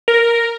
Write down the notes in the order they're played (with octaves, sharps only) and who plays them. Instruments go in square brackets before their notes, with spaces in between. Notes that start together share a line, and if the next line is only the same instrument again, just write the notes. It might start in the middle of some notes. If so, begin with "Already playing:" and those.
[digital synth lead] A#4